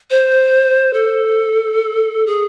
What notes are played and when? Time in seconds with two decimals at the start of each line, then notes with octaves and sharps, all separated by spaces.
0.10 C5
0.93 A4
2.26 G#4